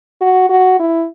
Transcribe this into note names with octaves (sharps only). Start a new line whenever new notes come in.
F#4
F#4
E4